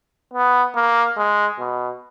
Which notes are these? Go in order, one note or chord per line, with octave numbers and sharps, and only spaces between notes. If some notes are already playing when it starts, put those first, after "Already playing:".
B3
A#3
G#3
B2